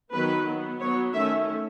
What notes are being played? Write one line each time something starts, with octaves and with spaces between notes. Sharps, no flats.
D#3 F#3 B3 B4
F#3 B3
F#3 B3 C#5
D#3 A3 C#4 E5